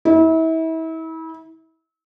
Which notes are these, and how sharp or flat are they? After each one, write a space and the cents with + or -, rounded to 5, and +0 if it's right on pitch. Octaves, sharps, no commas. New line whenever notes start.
E4 -35